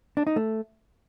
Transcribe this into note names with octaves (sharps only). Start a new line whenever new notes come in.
D4
D#4
A3